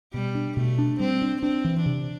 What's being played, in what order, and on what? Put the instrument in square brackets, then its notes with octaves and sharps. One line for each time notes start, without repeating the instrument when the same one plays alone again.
[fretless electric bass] B2 [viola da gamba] G3
[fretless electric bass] D4
[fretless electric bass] B2 [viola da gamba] A3
[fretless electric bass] D4
[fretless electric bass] G3 [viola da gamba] C4
[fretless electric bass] D4
[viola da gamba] C4 [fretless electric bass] D4
[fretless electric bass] E3
[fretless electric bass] C3 [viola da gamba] D4